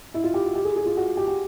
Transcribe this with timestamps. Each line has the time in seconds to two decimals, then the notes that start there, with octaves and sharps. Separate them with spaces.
0.14 E4
0.24 F4
0.34 G4
0.45 F#4
0.55 G4
0.65 G#4
0.76 G#4
0.86 F4
0.97 F#4
1.17 G4
1.27 G4